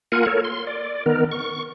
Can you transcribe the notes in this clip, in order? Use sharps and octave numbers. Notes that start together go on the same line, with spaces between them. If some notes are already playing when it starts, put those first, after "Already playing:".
A#3 F4 A#4 F#5 G#5
A4 A#4 C#5
C6
D5
D#3 B3 A#4
C#6